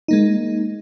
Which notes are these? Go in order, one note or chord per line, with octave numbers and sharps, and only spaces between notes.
G#3 A#3 D#4